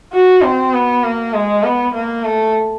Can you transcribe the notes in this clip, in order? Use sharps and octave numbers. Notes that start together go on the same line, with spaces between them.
F#4
C4
B3
A#3
G#3
B3
A#3
A3